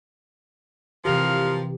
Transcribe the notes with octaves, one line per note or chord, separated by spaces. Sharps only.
C3 E3 F3 G4 A#4 F5